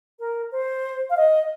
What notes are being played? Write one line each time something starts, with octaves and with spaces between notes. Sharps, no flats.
A#4
C5
F5
D#5